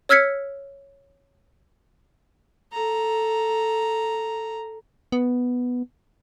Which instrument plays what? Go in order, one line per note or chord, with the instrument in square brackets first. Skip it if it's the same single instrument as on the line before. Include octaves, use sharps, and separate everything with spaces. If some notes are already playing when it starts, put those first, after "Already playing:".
[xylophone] C#5 E6 F6 G#6 B6 C#7
[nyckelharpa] A4 A#5
[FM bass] B3